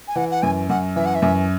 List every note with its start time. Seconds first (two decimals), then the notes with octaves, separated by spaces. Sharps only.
0.08 G#5
0.16 E3 F#5
0.31 F#5
0.42 F#2 G#5
0.69 F#2 F#5
0.96 E3 E5
1.05 F#5
1.15 E5
1.22 F#2